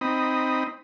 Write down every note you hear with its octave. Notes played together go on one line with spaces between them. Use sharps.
C4 D#4 B5 D#6